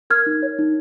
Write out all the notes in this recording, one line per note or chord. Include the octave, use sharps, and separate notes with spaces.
A#4 F6 G#6
D#4
C#5
D#4